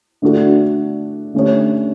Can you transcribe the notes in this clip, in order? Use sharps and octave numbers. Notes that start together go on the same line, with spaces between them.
D3 A3 D4 F#4 A4
D3 A3 C#4 G4 C#5